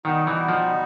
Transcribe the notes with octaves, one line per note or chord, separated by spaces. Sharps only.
B2 D#3 G3 B3 D#4 F#4
E3
F3